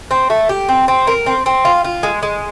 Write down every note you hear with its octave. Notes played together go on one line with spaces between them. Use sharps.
C4
A3
G4
C4
C4
A#4
C4
C4
F4
F4
G#3
G#3